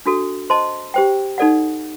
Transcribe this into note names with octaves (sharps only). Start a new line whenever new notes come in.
D4 F#4 A4
C5 D#5 A5 C6
G4 C5 G5
D#4 A4 D5 F#5